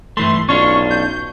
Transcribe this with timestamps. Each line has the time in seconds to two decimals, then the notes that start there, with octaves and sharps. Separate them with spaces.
0.17 G2 E3 A3 C6
0.49 B1 C#4 D4 F4 C#6
0.91 G6